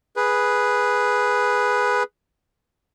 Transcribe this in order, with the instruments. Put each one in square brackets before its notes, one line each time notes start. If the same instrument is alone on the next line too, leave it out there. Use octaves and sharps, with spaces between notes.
[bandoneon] G#4 B4